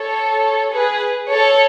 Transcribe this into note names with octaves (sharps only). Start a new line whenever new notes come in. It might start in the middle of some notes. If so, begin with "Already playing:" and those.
Already playing: A4 C#5
G#4 B4
A4 C#5